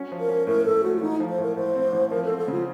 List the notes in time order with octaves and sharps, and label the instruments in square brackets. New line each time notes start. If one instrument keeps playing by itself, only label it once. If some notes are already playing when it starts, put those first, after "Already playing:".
Already playing: [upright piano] F#3 C#4
F3
[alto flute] A#4
[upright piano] C#4
[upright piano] A2 [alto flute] A#4
[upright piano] A2 [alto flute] A4
[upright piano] A3 [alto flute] F#4
[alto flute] F4
[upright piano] A1 [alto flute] D#4
[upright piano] F3
[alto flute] C5
[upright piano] A2 [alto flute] A#4
[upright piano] A2 [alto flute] C5
[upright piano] C4
A1
[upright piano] F3 [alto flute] A#4
[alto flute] A4
[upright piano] C4
[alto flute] A4
[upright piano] C#3 [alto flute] F4